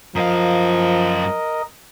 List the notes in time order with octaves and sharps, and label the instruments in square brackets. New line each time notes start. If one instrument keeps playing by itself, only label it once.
[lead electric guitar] F#2 F5 [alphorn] F3 [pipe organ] A#4 D#5